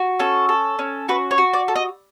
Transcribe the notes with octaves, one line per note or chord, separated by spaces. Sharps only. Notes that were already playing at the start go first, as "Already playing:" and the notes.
Already playing: F#4
C#4 A4
A4
C#4
F#4 B4
C#5
F#4
D5
A4
D#5